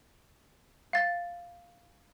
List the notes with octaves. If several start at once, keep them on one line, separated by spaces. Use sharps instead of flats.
F5 A6